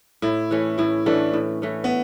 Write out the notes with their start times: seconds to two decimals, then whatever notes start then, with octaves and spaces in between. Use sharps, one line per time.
0.22 A2 E4
0.51 E3 A3 C#4
0.78 A2 E4
1.06 E3 A3 C#4 D4
1.34 A2
1.62 E3 A3 C#4
1.84 B3